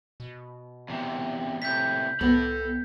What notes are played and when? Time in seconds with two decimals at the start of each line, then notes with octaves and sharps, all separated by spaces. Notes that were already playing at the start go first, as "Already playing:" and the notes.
0.20 B2
0.89 E2 C3
1.62 A2 C3 G6 B6
2.21 C2 B3 A4 B5